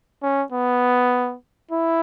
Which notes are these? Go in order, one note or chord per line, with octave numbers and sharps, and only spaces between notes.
C#4
B3
E4